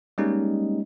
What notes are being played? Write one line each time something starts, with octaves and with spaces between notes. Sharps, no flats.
G3 G#3 A#3 C#4 D#4